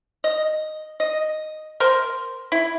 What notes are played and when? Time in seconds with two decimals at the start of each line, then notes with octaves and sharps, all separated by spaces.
0.24 D#5
1.00 D#5
1.80 A#4 C5
2.52 E4